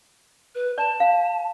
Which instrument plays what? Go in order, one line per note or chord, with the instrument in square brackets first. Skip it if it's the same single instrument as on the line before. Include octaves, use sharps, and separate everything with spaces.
[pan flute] B4
[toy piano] D5 [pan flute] A5
[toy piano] F5